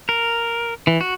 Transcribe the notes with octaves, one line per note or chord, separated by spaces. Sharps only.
A#4
E3
F#4